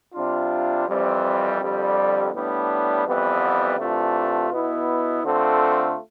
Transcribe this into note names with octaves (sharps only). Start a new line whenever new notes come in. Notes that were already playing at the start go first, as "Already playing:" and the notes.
C3 G3 D4 F4
F2 E3 G3 C4
F2 D3 G3
A2 G3 B3 D4
F2 E3 G3 B3
C3 E3 A3 D4 F4
B2 B3 E4
D3 A3 C4 F4 A4